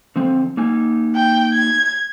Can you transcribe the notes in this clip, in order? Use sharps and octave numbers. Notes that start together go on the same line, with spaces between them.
D3 F3 C4
A#3 D#4 G#5
G5
G#6